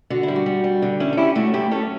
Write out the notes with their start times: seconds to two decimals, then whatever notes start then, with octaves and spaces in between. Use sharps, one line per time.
0.10 D3 F#4
0.23 G3 E4
0.36 F#4
0.46 G3
0.64 G3
0.82 D3
1.00 C#4 E4
1.13 A4
1.17 C#4 E4 G4
1.35 A3 F#4 A4
1.54 F#2 E4 G4
1.71 C#4 A4 C#5